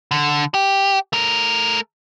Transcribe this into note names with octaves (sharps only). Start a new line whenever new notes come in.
D3
G4
A3 A#4